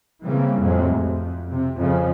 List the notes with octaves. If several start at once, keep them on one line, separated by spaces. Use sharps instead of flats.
C#3 E3 G3 A#3 C4
F2 A2 C3 F#3 G#3
F2
C3
F2 C#3 F3